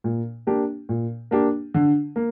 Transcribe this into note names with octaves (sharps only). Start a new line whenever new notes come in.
A#2
A#3 D4 G4
A#2
A#3 D4 G4
D3
A#3